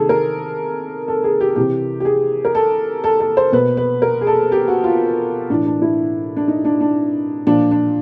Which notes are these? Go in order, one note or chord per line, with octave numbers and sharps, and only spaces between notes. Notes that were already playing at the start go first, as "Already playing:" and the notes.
Already playing: C3 D#3 G#4 A4
A#4
A4
G#4
G4
C3 E3 G4
G4
G#4
A#4
A4
A4
A4
C5
B2 B4
B4
A#4
G#4
A4
G4
F#4
F4
A2 E3 D4
D4
E4
D4
D#4
D4
D4
A#2 F3 D4
D4